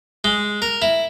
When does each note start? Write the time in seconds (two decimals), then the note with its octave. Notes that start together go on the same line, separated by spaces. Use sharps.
0.24 G#3
0.62 A#4
0.82 E4